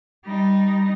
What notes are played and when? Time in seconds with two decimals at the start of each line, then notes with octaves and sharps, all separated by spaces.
0.24 G3 D#4